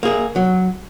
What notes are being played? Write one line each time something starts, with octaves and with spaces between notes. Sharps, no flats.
A#3 G#4
F#3